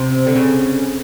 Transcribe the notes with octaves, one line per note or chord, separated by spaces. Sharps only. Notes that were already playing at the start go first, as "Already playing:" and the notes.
Already playing: C3
D3
C#3